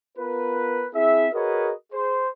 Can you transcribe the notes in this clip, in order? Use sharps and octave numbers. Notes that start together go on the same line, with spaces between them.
B3 F4 A#4 B4
C4 E4 G#4 E5
F#4 G#4 A#4 B4 C#5 D#5
G#4 C5